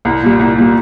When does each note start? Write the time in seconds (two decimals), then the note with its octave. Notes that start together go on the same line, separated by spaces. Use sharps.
0.05 C2
0.22 A#2 G3
0.39 C2
0.56 A#2 G3